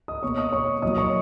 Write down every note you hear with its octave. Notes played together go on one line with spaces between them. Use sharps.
D#5 D#6
B2 A#3 C#5 C#6
D#5 D#6
C#5 C#6
A#2 F#3 A#3 D#5 D#6
C#5 C#6